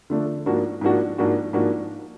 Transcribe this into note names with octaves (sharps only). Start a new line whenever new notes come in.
D3 F3 A3 D4
G#2 F3 A#3 D4 F#4
G#2 F3 A#3 D4 F#4
G#2 F3 A#3 D4 F#4
G#2 F3 A#3 D4 F#4